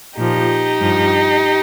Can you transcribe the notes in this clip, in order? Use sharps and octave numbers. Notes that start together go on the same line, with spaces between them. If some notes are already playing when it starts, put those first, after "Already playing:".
A#2 F3 D#4 G4
G2 F3